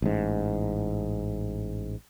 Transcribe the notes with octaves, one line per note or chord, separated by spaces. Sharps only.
A1 G#2